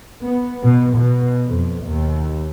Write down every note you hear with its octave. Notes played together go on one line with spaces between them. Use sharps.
B3
B2
B2
F2
D#2